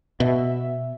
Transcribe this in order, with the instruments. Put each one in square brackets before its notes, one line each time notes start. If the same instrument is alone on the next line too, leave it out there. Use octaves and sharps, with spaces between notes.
[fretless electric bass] B2 [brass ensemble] E5